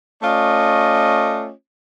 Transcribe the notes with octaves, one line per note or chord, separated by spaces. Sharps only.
A3 C#4 F4 D5 D#5